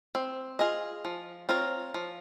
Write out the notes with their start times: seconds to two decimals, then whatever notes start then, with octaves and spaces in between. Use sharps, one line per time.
0.15 C4
0.59 F4 G#4 D#5
1.05 F3
1.49 C4 F4 A#4 C#5
1.94 F3